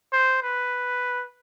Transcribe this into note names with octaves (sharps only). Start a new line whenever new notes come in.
C5
B4